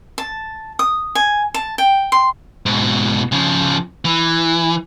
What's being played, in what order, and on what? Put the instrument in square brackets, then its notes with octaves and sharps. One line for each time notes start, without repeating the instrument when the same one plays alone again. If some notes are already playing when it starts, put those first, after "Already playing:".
[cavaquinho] A5
D#6
G#5
A5
G5
C6
[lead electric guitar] G#2 B2
C#3 F3
E3